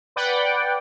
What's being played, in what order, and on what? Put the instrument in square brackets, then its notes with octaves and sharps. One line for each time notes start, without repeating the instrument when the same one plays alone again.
[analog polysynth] B4 D5 F#5 G5